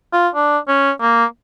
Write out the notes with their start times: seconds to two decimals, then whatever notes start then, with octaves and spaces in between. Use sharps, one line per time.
0.13 F4
0.35 D4
0.68 C#4
1.01 A#3